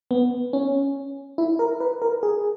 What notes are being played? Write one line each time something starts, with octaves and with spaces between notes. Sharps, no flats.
B3
C#4
E4
A#4
B4
A#4
G#4